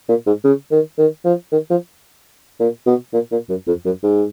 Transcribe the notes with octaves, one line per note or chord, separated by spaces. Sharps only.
A#2
G#2
C#3
D#3
D#3
F3
D#3
F3
A#2
B2
A#2
A#2
F#2
F2
F#2
G#2